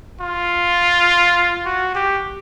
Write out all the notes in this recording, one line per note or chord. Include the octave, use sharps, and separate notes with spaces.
F4
F#4
G4